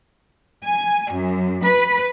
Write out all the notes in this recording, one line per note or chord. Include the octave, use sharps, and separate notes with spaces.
G#5
F#2
B4